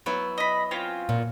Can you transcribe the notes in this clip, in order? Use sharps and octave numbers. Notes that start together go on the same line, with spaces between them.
F#3 B3 E4
D#5 B5
C4 C#4 F4
A#2